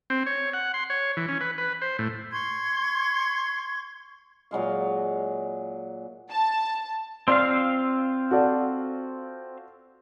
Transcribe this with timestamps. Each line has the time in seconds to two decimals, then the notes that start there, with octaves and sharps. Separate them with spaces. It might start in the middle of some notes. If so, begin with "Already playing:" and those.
0.10 C4
0.26 C#5
0.54 F#5
0.74 C6
0.90 C#5
1.17 E3
1.29 C#4
1.41 B4
1.58 B4
1.82 C5
1.99 A2
2.31 C6 C#6 G#6
4.51 A#2 F#3 G#3 F5
6.31 A5
7.28 C4 F4 D5 F5 C6 E6
8.31 F#4 A4 D5